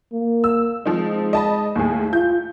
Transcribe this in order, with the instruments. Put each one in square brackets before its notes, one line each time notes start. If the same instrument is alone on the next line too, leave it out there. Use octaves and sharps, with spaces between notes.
[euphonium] A#3
[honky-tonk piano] E6
[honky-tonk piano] F3 C4 D#4 [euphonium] G#3
[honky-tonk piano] D#5 A5 B5
D#2 A2 G#4
[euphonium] F4 [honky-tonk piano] G6